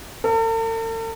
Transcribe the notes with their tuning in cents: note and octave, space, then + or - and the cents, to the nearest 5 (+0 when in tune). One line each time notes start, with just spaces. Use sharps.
A4 +45